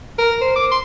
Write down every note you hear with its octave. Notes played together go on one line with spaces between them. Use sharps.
A#4
C5
D6
C6